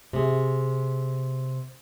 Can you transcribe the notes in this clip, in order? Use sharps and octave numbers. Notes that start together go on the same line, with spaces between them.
C3 G#4